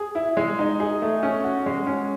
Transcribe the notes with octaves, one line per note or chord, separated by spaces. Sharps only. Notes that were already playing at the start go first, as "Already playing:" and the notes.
Already playing: G#4
E4
G#3
D#4
G#4
A3
C#4
F#4
G#3
C#4